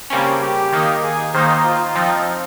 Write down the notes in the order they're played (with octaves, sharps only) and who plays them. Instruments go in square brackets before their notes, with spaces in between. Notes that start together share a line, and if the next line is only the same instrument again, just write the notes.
[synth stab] C#3 G3 A#3 C#4 [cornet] C4
[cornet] G4
[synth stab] D#3 A#3 D#4
[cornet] G#4
[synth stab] D#3 A#3 D#4 [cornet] C5
[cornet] F4
[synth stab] F3 C4 D#4